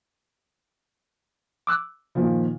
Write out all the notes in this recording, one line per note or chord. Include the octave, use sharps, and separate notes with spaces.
D6 E6 F#6
A#2 D#3 F3